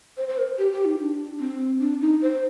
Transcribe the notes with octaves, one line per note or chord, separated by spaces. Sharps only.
C5
C5
A#4
G4
G4
D#4
D4
C4
D4
D#4
C5